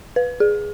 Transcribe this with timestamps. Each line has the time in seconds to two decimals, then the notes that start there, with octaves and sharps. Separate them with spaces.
0.16 B4
0.40 G#4